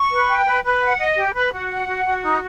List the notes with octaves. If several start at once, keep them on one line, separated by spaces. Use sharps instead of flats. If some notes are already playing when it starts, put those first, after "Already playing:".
Already playing: C#6
B4
G5
B4
B4
F#5
D#5
G4
B4
F#4
F#5
F#4
F#4
D#4